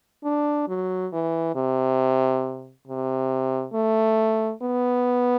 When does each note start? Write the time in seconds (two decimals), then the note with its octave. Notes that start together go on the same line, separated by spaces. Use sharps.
0.24 D4
0.68 F#3
1.12 E3
1.55 C3
2.87 C3
3.73 A3
4.62 B3